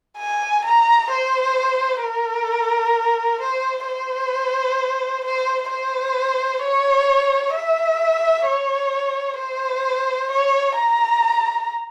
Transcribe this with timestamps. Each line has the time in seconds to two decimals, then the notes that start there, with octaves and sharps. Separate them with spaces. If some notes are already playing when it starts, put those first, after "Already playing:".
0.19 G#5
0.65 A#5
1.11 C5
2.03 A#4
3.41 C5
3.87 C5
5.25 C5
5.71 C5
6.64 C#5
7.55 E5
8.47 C#5
9.39 C5
10.31 C#5
10.77 A#5